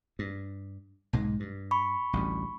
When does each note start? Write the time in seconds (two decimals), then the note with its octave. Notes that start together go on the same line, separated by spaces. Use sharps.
0.19 G2
1.13 B1 G#2 G#3
1.40 G2
1.71 B5 C#6
2.13 A1 D2 G3